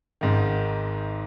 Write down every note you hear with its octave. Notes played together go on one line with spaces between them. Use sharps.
G#1 G#2 D#3